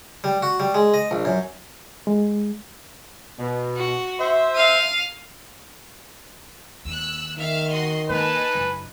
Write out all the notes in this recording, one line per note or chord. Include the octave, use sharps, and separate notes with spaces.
G3
F#4
G3
G#3
D#5
A#1
F#2
G#3
B2
F#4
C5 E5
F5 D#7
D#2 E6 F#6
D#3 E5 F5 F6
F#4 D#5 C6
A#3 D#4 B4 G#5 A5
F#1